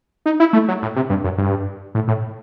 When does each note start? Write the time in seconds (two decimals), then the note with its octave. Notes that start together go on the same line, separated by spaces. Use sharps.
0.26 D#4
0.40 E4
0.53 A3
0.68 F#3
0.82 A2
0.96 C3
1.10 G2
1.24 F#2
1.38 G2
1.95 A2
2.08 A2